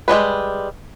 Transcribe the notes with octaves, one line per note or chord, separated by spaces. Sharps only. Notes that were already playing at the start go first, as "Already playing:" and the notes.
G3 G#3 D4 B4